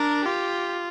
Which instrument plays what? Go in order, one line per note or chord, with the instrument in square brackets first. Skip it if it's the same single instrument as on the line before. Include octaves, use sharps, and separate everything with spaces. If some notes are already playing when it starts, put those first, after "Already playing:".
Already playing: [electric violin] D4 [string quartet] A#4
[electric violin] F4 [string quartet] G4